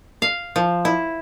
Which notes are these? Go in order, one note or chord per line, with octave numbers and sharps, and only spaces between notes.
F5
F3
E4